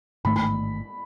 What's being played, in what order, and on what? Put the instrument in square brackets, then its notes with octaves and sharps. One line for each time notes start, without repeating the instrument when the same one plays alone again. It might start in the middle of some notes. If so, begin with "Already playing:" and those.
[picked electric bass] A1 G#2 D#3 A3 [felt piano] B5
[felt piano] B5